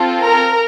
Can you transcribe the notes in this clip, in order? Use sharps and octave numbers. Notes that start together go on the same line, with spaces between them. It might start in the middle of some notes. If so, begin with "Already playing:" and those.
Already playing: C4 F4 A4
A#4 A#5